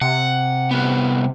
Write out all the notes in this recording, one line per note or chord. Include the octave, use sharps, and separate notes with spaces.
C3 F#5
C2 B3